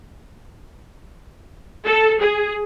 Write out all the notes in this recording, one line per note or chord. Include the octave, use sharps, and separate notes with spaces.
A4
G#4